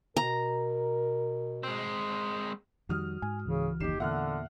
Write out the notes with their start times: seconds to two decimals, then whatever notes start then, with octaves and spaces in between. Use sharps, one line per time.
0.17 B2 A#4 A#5
1.63 G#3 C4
2.89 F2 D#3 G3 F#4 D#6 F6
3.22 G#2 G#5
3.46 C#2 C#3 E3
3.80 F#1 D#2 D#4 G4 C7 E7
4.00 E2 A#2 D3 E5 F#5 F6 F#6